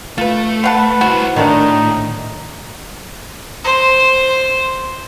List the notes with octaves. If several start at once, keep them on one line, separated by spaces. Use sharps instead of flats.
A3 F4 B4
B4 F5 F#5 A5
B3 E4 F#4 C5
A2 D#3 A3 D4 D#4
C5